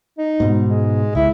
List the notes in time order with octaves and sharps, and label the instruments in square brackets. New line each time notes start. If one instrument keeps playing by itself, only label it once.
[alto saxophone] D#4
[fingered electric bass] G#2 B2
[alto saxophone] G#3
[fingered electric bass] C#2 [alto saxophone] E4